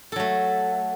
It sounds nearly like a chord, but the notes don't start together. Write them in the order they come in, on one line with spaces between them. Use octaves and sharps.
A4 F#3 A3